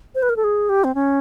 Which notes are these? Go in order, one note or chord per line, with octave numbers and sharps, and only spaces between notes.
C5
B4
A#4
A4
G#4
G4
C4
C#4